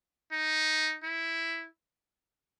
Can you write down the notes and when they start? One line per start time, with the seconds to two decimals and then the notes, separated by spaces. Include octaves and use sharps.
0.32 D#4
1.04 E4